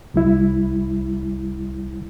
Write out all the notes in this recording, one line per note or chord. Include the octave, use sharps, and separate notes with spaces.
C2 G3 E4